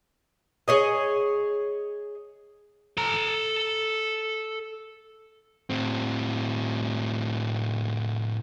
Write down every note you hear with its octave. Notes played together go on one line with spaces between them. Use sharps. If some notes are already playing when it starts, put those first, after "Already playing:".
G#4 C#5 D#5
A4 A#5
A2 C4